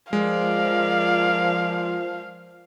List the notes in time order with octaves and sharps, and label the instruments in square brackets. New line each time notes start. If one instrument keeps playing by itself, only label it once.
[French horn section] F3 [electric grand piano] G#3 [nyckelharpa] A#4 D5 [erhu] F5